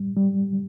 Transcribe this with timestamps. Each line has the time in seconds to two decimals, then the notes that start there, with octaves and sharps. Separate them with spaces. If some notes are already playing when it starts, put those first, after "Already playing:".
Already playing: G3
0.17 G3